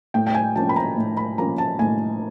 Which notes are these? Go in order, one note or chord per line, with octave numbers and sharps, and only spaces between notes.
A2 G5
G5
G#5
F3 A#3 C#4 A5
B5
A#5
A2
B5
F3 A#3 C#4 A#5
A5
A2 G#5